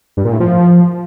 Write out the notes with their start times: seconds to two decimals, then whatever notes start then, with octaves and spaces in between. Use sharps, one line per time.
0.17 G2
0.25 A#2
0.32 A2
0.40 F3